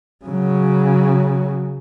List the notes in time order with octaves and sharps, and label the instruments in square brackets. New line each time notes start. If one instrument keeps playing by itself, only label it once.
[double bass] C#3 F#3